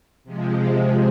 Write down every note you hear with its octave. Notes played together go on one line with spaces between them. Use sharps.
C3 F3 G#3